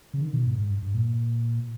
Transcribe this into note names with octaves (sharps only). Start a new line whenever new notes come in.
C#3
D#3
B2
G#2
G#2
G2
G2
A#2